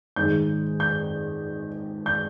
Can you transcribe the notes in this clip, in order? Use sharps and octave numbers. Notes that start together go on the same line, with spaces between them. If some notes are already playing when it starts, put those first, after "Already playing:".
G#2 D#3 G#3 G6
G6
G6